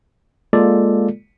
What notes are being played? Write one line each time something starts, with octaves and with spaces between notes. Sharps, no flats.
G#3 A#3 F4 A4 D5